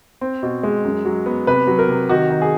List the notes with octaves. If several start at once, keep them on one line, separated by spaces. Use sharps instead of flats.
C4
B2
G#3
F#2
F#3
B3
C3 B4
F#3
A#4
C3
D#3 F#4
D#3
G#4